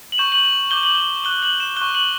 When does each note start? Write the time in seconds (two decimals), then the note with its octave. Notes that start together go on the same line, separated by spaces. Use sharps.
0.12 F#7
0.18 C#6 G6 E7
0.32 F#7
0.45 F#7
0.71 D6 G6 G7
0.83 F#7
0.95 G7
1.24 D6 F#6 G7
1.42 F#7
1.60 E7
1.77 C#6 F#6 G7
1.95 F#7